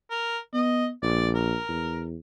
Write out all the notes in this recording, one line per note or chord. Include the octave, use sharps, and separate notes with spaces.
A#4
B3 D#5
A#1 D5
A#4
E2